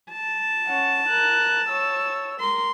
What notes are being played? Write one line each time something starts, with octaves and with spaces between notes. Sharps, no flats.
A5
C#4 F#5
A#4 F#6
C#5 E6
A#4 C6